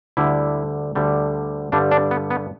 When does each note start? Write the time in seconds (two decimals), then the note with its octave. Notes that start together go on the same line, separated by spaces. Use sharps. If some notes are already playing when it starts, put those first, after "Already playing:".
0.17 D2 D3 G3 E4
0.95 D2 D3 G3
1.72 G2 D3 G3 D4
1.91 D4
2.11 B3
2.30 B3